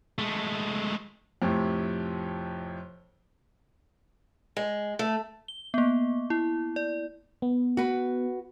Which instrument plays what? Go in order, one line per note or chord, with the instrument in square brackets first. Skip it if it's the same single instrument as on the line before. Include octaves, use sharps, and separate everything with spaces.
[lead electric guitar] G#3 A3
[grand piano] F2 A2 C3
[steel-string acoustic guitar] G#3
A3
[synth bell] G7
A#3 B3
E4
D5
[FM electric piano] B3
[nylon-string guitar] F#4 B4